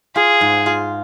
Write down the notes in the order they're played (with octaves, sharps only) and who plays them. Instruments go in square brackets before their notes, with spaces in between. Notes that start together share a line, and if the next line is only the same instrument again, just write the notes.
[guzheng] F4 [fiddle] G#4
[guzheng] G#2
F4